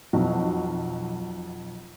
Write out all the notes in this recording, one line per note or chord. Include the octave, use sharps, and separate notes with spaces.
B1 F2 F#3 F#4